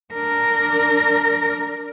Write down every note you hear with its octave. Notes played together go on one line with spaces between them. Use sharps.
D4 A#4